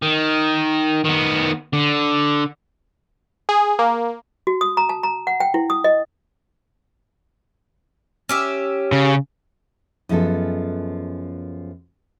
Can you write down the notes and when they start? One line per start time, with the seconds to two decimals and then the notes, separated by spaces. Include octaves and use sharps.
0.02 D#3
1.05 D#3 B3
1.73 D3
3.49 G#4
3.79 A#3
4.47 F#4
4.61 D#6
4.77 A#5
4.89 A5
5.03 A#5
5.27 F#5
5.40 G5
5.54 E4
5.70 D#6
5.84 D#5
8.29 C#4 G4 E5
8.92 C#3
10.09 F#2 F3 G#3 B3 A4